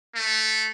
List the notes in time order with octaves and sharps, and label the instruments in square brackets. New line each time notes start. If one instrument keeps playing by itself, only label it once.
[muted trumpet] A3